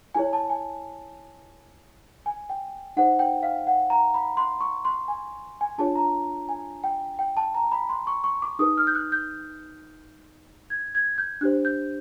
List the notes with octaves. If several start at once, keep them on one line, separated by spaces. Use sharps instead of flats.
E4 G#4 C#5 G#5
A5
G#5
G#5
G5
D#4 G#4 C5 F#5
G5
F5
F#5
A#5
B5
C6
C#6
C6
G#5
G#5
D4 F4 G#4 C#5 A5
A#5
G#5
G5
G5
A5
A#5
B5
C6
C#6
C#6
D6
D#4 G#4 B4 D#6
F6
G6
F#6
G6
G#6
G#6
G6
D4 G4 C5 F#6
G6